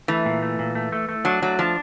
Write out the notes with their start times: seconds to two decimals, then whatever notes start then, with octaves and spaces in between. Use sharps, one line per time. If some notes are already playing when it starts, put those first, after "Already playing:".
0.08 E3 A3
0.26 A#2
0.42 A3
0.59 A#2
0.75 A3
0.92 A3
1.09 A3
1.25 F#3 D4
1.42 F#3 A3
1.59 F3 D4